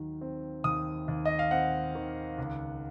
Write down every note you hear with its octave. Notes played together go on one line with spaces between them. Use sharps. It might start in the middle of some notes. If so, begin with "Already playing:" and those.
Already playing: D#2 D#3 F#3
C4
D#2 D#6
D#2
D#5
F5
C4 F#5
D#3
C#2